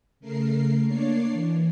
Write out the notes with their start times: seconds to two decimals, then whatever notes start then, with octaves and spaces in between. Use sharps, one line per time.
0.20 C#3 A3 A#4 C7
0.85 A#3 D4 C#5 D5 C7
1.32 E3